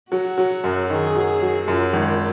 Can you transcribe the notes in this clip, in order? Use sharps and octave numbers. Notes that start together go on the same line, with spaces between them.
F#3 F#4
F#3
F#2
D#3 G#4
F#3
F#3
F#2 F4
G#1